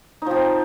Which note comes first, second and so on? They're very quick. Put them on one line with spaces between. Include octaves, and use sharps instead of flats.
D#4 F3 C4